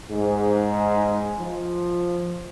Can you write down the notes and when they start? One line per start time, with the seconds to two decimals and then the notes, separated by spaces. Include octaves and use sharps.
0.11 G#2
1.40 F3